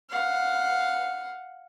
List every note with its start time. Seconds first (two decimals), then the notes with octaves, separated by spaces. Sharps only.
0.10 F5 F#5